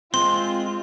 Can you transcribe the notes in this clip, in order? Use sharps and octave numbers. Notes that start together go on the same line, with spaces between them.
G#3 C4 F4 C6